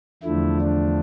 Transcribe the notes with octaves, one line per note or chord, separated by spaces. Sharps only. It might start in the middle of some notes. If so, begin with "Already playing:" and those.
E2 D3 F3 A3 E4
D4